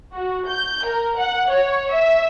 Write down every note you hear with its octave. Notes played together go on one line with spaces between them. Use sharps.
F#4
G6
A#4
F#5
C#5
E5